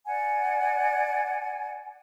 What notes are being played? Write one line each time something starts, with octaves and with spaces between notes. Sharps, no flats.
D5 F#5 G#5